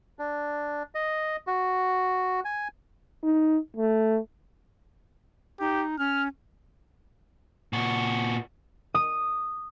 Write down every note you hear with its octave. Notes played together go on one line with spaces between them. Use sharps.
D4
D#5
F#4
G#5
D#4
A3
D#4 G4
C#4 F6
A#2 F#4
D#6